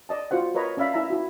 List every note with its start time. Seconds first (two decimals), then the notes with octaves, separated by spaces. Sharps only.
0.09 D5 D#5 A5
0.31 F4 F#4 C5 F#5
0.54 A#4 B4 C#5 D#5 A#5 B5
0.77 C#4 D5 E5 F5 B5
0.93 E4 E5 A#5
1.10 E4 F#4